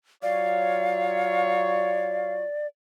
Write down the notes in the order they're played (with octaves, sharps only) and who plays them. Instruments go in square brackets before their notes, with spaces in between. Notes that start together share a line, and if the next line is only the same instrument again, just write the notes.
[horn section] F#3 F4 C#5 [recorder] D5 [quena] F5